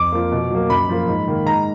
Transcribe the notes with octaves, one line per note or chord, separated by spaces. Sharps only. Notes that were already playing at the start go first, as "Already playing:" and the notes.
Already playing: F2 D6
F3 A#3
B2
F#3 A#3
F#2 B5
F3 A#3
G#2
D#3 A#3
G#2 A#5